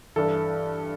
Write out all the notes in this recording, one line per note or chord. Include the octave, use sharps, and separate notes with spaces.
G2 E3 A4